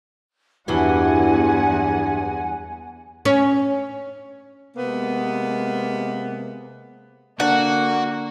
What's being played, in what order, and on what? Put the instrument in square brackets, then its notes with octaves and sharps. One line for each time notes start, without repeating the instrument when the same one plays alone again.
[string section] E2 F#5 [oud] G2 E3 F#3 [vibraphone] D4 G4 [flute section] G#5
[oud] C#4
[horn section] C3 G#3 A#3 B3
[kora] D3 [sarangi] A#3 [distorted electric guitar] F#4 [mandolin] F#5